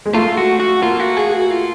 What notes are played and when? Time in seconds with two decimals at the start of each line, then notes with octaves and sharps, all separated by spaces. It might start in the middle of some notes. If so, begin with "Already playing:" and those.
0.06 G#3
0.14 A3 F4
0.37 F#4
0.60 F#4
0.82 A#3 F4
1.00 F#4
1.17 G#4
1.33 F#4
1.50 F4